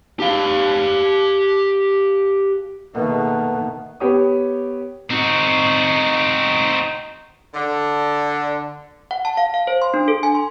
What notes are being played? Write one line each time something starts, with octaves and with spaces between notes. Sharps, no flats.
G4 F5
B2 D#3 A3 A#3 B4
B3 G4 C#5 D#6
C4 D#4 F#4
D3
F#5
A5
F5
F5
C5
C6
D4
A4
G#5
C6